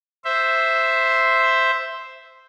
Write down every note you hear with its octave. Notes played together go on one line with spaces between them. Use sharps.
C5 E5